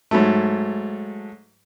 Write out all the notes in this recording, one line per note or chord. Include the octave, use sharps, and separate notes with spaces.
G#2 F#3 A3